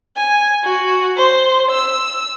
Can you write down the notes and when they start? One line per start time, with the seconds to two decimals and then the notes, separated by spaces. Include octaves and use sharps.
0.17 G#5
0.63 F#4
1.18 C5
1.70 E6